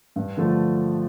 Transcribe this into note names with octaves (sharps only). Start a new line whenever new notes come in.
G2
D3 F3 A3